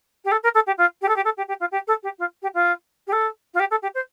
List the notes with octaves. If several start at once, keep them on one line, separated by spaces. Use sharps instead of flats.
G4
A4
A#4
A4
G4
F4
G4
A4
G4
A4
G4
G4
F4
G4
A4
G4
F4
G4
F4
G4
A4
F4
G4
A4
G4
C5